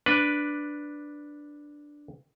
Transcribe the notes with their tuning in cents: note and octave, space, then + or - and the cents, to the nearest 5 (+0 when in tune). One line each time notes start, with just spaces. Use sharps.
D4 +0 B4 +0